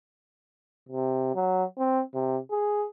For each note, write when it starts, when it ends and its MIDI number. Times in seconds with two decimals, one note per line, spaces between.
0.89 1.34 48
1.35 1.64 54
1.78 2.02 60
2.14 2.38 48
2.51 2.86 68